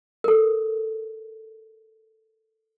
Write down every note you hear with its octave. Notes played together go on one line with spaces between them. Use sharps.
A4 A#4